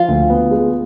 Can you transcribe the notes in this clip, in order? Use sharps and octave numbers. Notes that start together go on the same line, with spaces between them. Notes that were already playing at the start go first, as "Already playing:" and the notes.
Already playing: F3 F4
D2
B3
G#3